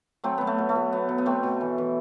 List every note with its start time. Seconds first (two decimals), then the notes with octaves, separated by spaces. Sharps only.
0.24 F#3 A3 C4
0.38 F#3 B3
0.47 A3
0.58 B2
0.69 A3
0.76 B2
0.93 F#3 B3
1.09 F#3
1.18 B3
1.26 B2 A3 C4
1.43 B2
1.61 E3
1.78 E3